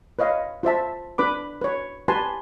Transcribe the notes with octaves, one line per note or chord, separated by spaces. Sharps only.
B4 C#5 D#5 F5
F4 C5 E5 A5
D4 B4 B5 D6
B4 C#5
G4 B4 G#5 A5 C6